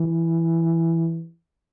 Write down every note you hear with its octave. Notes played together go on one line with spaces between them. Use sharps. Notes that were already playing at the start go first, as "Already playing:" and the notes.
Already playing: E3